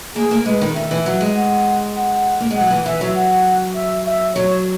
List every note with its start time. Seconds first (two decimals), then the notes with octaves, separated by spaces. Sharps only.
0.16 A#3 G#4
0.31 A#3
0.46 G#3 B4
0.61 D#3
0.76 D#3 E5
0.91 E3
1.06 F#3
1.21 G#3
1.37 F#5
1.96 F#5
2.40 A#3
2.51 G#3
2.56 F#3 F#5
2.71 E3
2.86 E3 E5
3.01 F#3
3.16 F#5
3.75 E5
4.06 E5
4.35 F#3 C#5